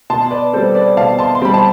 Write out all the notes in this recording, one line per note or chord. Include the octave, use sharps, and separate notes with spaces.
B2 A5 C6
B4 D5
G3 C4 A4 C5
B4 D5
B2 F5 A5
A5 C6
C6
G3 C4 B5
A5